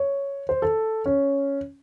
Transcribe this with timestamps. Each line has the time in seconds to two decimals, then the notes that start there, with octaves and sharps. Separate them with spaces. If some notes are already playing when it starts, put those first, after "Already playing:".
Already playing: C#5
0.49 C5
0.62 A4
1.06 C#4